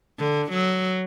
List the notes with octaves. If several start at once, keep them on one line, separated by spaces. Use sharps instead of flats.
D3
F#3